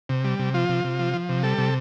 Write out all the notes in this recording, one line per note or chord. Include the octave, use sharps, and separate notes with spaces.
C3
G3
C3
F3 F4
C3
C3
F3
F3
C3
G3 A4
C3